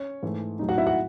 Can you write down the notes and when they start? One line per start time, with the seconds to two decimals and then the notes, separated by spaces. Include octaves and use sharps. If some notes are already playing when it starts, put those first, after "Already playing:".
Already playing: C#4 C#5
0.23 G#2 E3 A3
0.59 A2 F#3 A3 D#4
0.69 F#4 F#5
0.78 E4 E5
0.87 F#4 F#5